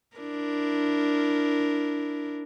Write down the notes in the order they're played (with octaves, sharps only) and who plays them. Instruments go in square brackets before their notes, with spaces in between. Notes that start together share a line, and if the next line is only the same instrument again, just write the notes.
[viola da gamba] D4 E4 A#4